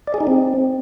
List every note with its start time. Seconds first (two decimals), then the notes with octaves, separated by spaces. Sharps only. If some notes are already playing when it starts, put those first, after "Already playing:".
0.07 D5
0.14 G#4
0.21 D#4
0.27 C4